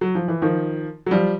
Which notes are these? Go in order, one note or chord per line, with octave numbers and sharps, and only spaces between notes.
F#3
F3
E3
D#3 F3
F#3
F3 G3